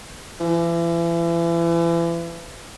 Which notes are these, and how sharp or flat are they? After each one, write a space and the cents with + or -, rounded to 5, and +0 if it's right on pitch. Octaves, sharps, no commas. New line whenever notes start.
E3 +35